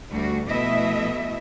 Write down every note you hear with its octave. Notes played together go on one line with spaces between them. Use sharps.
D2 G3 F#4
B2 F3 A3 E4 D#5 E5